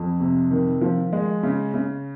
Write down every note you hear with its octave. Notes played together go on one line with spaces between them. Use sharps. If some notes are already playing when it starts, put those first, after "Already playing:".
Already playing: F2
C3
D#3
F3
G#3
C#3
C#3